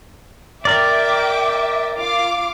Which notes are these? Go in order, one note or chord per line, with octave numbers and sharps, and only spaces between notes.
A#4 D5 E5 G5 D6
F4 F5 D6